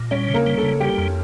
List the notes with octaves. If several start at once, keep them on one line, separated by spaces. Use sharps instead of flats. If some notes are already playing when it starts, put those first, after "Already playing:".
Already playing: A#2
G3 C#4 C#5
C#3
A#3 A#4
G3
A4
C#3
G3 G4
F2